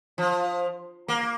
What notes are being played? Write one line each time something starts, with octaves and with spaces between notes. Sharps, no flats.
F3
A#3